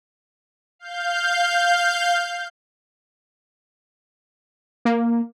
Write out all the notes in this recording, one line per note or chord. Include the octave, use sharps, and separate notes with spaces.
F5 G6
A#3